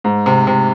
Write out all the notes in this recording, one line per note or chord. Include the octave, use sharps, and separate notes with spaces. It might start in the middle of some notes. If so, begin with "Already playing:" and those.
G#2
C3
C3